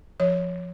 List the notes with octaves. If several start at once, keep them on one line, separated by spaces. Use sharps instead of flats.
F3 C#5